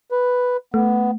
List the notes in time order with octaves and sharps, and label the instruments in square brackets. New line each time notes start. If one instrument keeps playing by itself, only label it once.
[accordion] B4
[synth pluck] A3 [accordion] B3